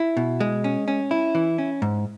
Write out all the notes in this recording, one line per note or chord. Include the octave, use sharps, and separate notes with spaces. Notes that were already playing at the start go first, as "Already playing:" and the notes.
Already playing: E4
B2
G#3
C#4
C#4
E4
E3
C#4
G#2